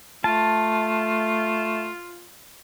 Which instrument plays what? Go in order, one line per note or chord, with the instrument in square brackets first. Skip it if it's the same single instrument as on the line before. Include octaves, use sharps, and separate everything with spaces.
[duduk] A3 [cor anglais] F4 [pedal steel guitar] A5